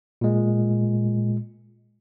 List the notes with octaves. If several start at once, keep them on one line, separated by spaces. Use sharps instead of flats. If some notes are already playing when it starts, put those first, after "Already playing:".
A#2 G#3